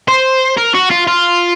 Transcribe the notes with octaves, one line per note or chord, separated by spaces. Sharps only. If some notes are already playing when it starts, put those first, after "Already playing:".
C5
A#4
F#4
F4
F4